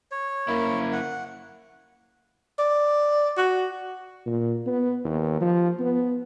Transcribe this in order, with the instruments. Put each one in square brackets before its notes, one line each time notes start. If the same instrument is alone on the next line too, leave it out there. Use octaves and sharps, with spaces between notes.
[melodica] C#5
[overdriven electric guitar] F#2 E4 [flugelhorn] A#3
[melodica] F#5
[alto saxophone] D5
F#4
[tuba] A#2
B3
D#2
F3
B3